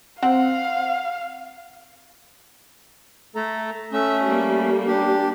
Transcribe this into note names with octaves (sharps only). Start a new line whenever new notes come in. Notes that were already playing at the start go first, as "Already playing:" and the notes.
C4 F5 F#5
A3 A4 A#5
A3 C#4 E5
G3 A#3
D4 G4